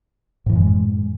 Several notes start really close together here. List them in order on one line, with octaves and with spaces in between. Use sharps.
A2 E3 F#2 G#3